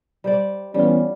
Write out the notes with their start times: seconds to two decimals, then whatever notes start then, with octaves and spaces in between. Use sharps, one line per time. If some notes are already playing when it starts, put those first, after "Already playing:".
0.24 G3 C5 D5
0.74 E3 G3 B3 C#4 F4